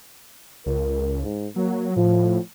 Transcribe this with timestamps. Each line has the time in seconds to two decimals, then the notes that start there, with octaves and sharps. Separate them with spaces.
0.66 C#2 A#4
1.23 G#2
1.56 F#3 A#3
1.96 A2 F3